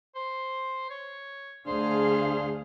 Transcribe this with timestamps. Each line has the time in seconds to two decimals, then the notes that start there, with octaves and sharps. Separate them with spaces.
0.15 C5
0.90 C#5
1.67 D2 D4 G#4 C5 F5